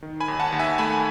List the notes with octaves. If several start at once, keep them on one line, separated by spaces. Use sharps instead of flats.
D#3
G#5 B5
D#2
F#5 A5
D#2
E5 G#5
A3 G#5 B5